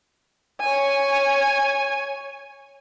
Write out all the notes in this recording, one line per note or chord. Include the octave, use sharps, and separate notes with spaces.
C#5 G#5